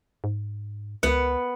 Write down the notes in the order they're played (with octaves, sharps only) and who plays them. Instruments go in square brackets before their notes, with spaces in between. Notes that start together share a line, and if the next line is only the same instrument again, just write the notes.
[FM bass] G#2
[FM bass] C#2 [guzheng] B3 F#5